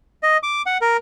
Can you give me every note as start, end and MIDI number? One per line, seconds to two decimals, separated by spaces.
0.23 0.37 75
0.43 0.62 86
0.66 0.78 78
0.81 0.97 70